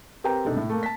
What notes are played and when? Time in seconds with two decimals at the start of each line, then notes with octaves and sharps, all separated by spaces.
0.24 C4 G4 A#4 B4 G5 A#5
0.45 E1 C3 D4 D#4 A4
0.57 A2
0.70 A3 A#3
0.83 A5 B6